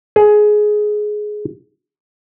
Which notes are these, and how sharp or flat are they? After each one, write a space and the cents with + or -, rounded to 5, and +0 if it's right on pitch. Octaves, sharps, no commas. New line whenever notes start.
G#4 +15